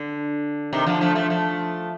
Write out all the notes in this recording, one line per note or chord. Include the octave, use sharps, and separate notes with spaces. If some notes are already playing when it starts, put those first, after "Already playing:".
Already playing: D3
C3 D#3
D3 F3
F3 A3
F3 A3
F3 A3